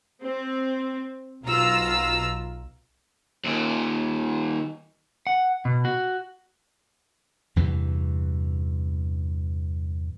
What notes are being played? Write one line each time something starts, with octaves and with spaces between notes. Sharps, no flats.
C4
B1 B2 F4 A#5 E6
D#2 A#2
F#5
B2
F#4
E2 G2 C3 E3